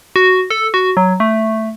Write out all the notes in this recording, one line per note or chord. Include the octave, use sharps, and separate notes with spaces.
F#4
A4
F#4
F#3
A3